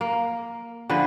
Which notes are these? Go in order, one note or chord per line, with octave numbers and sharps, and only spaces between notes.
A#3
D3 F3 G#4 B4